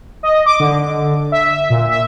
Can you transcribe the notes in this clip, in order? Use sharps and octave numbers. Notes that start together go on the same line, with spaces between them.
D#5
D6
D3
E5
A#2
E5